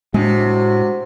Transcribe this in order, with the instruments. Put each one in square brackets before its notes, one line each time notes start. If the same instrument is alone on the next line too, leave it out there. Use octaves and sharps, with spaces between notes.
[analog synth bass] A2 [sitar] C3 [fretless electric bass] G#3 B3 D4 [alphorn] F#4